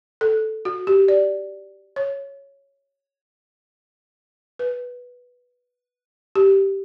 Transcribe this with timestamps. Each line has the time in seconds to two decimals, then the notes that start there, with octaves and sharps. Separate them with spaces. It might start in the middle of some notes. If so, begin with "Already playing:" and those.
0.21 A4
0.65 F#4
0.87 G4
1.08 D5
1.96 C#5
4.59 B4
6.35 G4